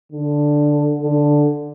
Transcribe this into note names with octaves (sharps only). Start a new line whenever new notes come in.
D3
D3